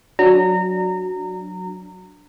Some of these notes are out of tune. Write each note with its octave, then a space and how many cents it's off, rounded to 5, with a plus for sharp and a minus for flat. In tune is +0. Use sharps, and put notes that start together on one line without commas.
F#3 -5 D4 +0 A#5 -25